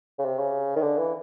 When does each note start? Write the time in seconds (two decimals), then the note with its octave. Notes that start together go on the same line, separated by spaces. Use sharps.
0.19 C#3
0.25 C3
0.39 C#3
0.76 D#3
0.82 D3
0.97 E3